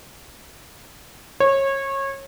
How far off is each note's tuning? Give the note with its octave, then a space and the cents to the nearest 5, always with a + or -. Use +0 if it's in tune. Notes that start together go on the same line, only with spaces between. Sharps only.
C#5 -25